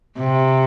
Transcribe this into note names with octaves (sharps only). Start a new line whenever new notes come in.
C3